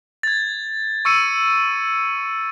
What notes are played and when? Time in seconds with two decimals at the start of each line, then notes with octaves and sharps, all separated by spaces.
0.23 G#6 A6
1.05 C#6 E6 C#7 D#7